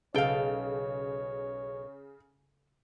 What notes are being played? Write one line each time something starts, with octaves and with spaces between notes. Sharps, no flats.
B1 C#3 A4 C#5 F5 G5